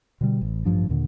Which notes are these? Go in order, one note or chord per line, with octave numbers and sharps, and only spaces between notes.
B2 D3 G3
A1
A1 G2 F3 D4
D#2 A#2 D3